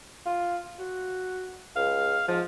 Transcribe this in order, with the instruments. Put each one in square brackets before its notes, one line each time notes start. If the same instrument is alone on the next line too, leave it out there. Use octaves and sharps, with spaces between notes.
[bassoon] F4
F#4
[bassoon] C#2 [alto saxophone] F5
[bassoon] G#2 [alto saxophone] F3